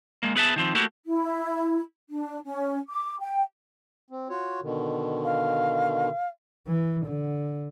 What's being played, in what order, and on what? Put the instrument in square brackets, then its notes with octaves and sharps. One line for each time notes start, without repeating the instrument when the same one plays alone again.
[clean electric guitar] G#3 A#3
B3 G#4 B4 E5 A5
D#3 F3 C4
A3 A#3 E4 F#4 G4
[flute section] E4
D4
C#4
D6
G5
[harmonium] C4
F4 F#4 C#5
B2 D3 D#3
[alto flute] F5
[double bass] E3
D3